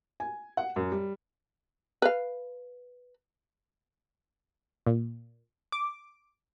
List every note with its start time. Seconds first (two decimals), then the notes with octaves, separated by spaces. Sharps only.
0.20 G#5
0.57 F#5
0.76 F#2
0.92 G3
2.02 B4 F5
4.87 A#2
5.72 D6